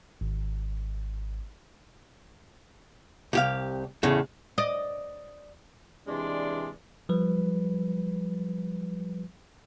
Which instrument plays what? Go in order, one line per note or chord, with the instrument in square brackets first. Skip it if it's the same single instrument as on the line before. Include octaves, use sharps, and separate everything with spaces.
[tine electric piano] G#1
[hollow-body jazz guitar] C2 G4 F5
E2 A2 C#3
[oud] D5 D#5
[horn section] C3 E3 G#3 D4 D5 C6
[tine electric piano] F3 G3 B4